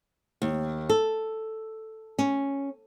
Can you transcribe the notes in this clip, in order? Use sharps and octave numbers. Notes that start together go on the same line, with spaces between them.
D#2
A4
C#4